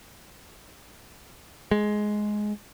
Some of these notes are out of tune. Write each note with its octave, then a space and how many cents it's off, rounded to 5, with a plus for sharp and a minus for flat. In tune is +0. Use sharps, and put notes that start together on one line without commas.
G#3 +10